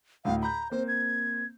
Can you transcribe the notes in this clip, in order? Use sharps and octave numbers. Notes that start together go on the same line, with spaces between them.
D2 A2 F5
A#5 B5 G6
A#3 C4 C5
G#6